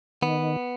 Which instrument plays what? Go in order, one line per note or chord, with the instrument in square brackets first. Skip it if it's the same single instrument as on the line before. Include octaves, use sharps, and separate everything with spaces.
[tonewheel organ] D#3 [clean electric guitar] B3